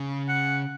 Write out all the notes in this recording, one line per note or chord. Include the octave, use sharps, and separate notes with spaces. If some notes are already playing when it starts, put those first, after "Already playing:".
Already playing: C#3
F#5